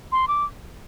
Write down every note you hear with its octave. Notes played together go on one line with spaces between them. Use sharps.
C6
D6